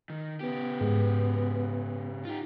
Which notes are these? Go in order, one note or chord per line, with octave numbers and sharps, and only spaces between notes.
D#3
C#3 B3 G4
G#2
D#4 F4 G4